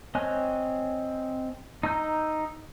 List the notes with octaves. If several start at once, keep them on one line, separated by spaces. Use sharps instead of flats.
C4 C#5 D#5 G#5 F#6
D#4 A#5 E6 G6